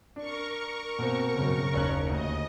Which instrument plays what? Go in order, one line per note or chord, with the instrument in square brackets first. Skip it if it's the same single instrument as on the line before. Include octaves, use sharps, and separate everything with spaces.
[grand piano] D4 [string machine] A#4 C#6
[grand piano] B2 A#3 C4
[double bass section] F#2 C#3
[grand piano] F#1 C#4 F#6 [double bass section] D#2
[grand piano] D2 [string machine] D#5